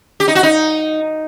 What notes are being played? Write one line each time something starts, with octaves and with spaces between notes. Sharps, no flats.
G4
D#4
F#4
D#4